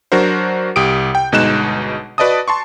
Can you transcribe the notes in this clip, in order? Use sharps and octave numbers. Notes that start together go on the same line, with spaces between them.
F#3 D4 F#4 A#4 C5
C2 G4 D#6 D7
G5
G1 B2 G#3 D#4 F#6 E7
F#4 B4 D5 D#5 A5 D#6
A5 C6 C#6